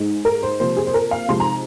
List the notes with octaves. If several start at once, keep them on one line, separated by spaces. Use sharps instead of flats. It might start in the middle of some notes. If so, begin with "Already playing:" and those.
Already playing: G#2 G#3 D#4
A#4
C5
C3 F3 A#3 C5
G#4
C5
A#4
F5
C3 F3 G#3 D#4 C6
A#5